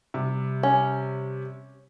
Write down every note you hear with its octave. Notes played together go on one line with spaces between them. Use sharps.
C3 G3
C#4